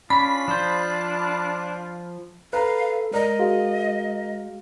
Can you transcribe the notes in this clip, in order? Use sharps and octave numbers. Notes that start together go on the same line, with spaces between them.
C#4 D4 F4 B5
F3 D4 C5
A4 B4 F5 A#5
G#3 A#4 D5 D#5
F#4 G#4 F5